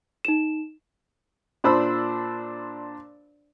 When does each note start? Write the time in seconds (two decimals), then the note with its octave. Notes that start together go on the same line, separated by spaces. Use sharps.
0.25 D#4 E7
1.64 A#2 D4 C5 B5 E6